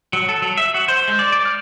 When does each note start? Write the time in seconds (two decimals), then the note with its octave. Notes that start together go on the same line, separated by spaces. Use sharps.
0.13 F#3
0.29 A4
0.42 F#3
0.57 E5
0.74 F#4
0.88 C5
1.08 G#3
1.19 D5
1.32 D5
1.45 F6